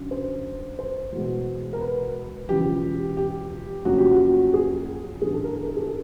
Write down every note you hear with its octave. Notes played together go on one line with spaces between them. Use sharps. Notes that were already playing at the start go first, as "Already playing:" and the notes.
Already playing: F#2 D3 F#3
C5
C5
E2 B2 G#3
A#4
B4
E1 E2 C#3 F3 G4
G4
F2 C#3 F#3 A#3 C#4 F#4
G4
F#4
G#4
A1 G2 E3 G#4
A4
A#4
A#4
A4
G#4
A4